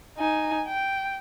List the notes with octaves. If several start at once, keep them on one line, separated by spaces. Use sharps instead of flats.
D#4 G#5
G5